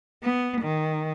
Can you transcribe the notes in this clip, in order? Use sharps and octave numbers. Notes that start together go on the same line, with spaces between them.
B3
D#3